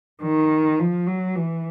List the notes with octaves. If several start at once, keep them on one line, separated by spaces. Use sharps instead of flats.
D#3
F3
F#3
E3